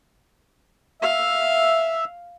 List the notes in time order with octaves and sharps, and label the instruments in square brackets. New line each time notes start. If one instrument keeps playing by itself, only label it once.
[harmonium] E5 [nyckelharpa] F5